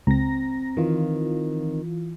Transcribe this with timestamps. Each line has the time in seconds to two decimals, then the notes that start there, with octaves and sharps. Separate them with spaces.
0.07 C#2 C4 A#5 A#6
0.77 D#3 E3 F4